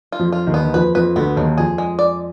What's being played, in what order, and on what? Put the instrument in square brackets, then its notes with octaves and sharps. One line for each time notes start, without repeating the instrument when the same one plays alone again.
[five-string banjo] F4
[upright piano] F2 F3
[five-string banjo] F4
[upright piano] D#2 D#3
[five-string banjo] B3
[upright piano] D#3
[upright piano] F2 F3 [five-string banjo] B4
[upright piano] F2 F3 [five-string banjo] B4
[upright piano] D2 D3 [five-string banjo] B3
[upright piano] D#2 D#3 [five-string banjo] F#3
[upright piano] F2 F3 [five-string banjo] G#4
[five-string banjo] G#3
D5